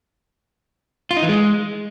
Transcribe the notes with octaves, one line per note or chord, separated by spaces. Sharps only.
F4
D#4
E3
G#3